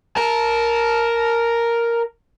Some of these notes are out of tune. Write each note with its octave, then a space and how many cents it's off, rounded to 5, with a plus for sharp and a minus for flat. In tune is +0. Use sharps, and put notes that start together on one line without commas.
A#4 +0 A5 -20